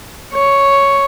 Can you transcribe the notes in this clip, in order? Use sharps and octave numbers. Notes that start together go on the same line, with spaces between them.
C#5